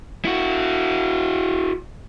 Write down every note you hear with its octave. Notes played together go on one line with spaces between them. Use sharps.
E4 F#4